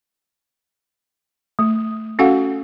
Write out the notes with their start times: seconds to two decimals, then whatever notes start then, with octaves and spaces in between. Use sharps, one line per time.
1.59 A3
2.19 C#4 F#4 A4 F5 F#5